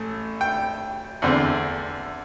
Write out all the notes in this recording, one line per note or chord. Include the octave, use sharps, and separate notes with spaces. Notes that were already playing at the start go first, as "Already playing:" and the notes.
Already playing: A1 A3
G5
E2 D3 C4